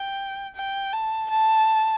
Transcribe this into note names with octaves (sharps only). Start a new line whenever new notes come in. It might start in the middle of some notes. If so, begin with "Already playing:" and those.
Already playing: G5
G5
A5
A5